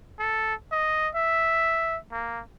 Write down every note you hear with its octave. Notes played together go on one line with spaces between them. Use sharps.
A4
D#5
E5
A#3